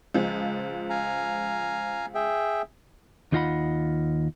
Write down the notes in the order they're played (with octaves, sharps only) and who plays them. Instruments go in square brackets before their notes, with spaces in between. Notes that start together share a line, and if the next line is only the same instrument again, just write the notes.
[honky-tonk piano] C#2 F3 G#3
[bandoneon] F5 G#5 A#5
G#4 E5 G5
[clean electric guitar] D#2 D#4 F4 D#5 F#5 B5